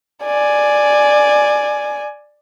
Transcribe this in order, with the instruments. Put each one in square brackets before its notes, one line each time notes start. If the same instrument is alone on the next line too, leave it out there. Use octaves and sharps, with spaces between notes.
[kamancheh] D5 G#5